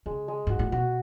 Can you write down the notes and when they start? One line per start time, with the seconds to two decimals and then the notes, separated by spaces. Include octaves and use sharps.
0.06 C#3 G#3
0.28 G#3
0.47 G#2 F#4
0.59 A2
0.72 B2 F#4